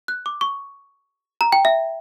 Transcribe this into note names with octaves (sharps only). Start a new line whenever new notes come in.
F#6
D6
C#6
A#5
G5
E5